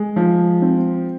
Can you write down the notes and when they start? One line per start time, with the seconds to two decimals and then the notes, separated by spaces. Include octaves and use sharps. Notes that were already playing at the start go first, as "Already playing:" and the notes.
Already playing: G#3
0.16 F3
0.62 C4